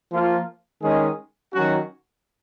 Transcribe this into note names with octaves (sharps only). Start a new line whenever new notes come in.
F3 A#3 F4
D#3 G#3 C#4 G#4
D#3 F#3 C#4 F#4